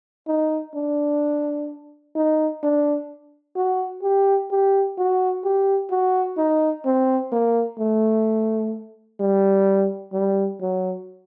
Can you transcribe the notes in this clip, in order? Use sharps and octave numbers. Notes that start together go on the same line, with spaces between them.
D#4
D4
D#4
D4
F#4
G4
G4
F#4
G4
F#4
D#4
C4
A#3
A3
G3
G3
F#3